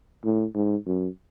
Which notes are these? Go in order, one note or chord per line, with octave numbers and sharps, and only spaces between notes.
A2
G#2
F#2